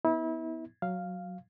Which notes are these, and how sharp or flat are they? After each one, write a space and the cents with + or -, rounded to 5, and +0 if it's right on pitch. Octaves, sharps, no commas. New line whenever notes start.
B3 +0 E4 -35
F#3 +0 F5 +0